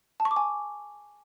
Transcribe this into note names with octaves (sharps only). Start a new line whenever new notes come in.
A5
C#6
D6
G#5